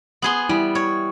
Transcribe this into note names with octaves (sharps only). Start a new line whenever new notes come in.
B3 G#4 C6
G3 E4
C#5